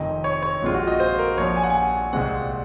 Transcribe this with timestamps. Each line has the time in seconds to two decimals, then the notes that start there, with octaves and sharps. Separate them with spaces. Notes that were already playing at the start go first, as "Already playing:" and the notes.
Already playing: F1 F2 D#3 D#5
0.24 C#5
0.43 C#5
0.62 A#1 A#2 G#3 C4 F4
0.74 F#4
0.87 D#5
1.00 C5
1.19 A#4
1.38 A#1 A#2 F3 C#5
1.56 G#5
1.63 F#5
1.70 G#5
2.13 C2 A#2 G#3 C4 F#5